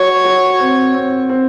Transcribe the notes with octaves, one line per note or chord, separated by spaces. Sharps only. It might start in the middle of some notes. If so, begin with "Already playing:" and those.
Already playing: F#4 C#5
F#4
C4
C4
C4